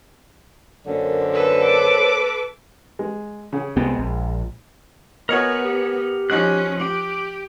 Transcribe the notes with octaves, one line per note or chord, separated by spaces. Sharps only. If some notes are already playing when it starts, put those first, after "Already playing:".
F#2 D3 A#3 C5 C#5
A4 B4
D6
G#3
C#3 G#4
C2 G#3 B3 C4
A#1
B3 F#4 A#4 C#5 D#5 F#5 G#5
G4
F3 C#4 D#4 F#4 D#5 F#6
G4 D6